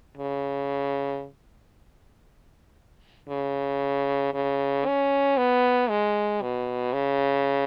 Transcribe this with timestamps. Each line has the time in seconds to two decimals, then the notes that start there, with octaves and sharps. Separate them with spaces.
0.17 C#3
3.29 C#3
4.34 C#3
4.86 C#4
5.37 B3
5.90 G#3
6.42 B2
6.93 C#3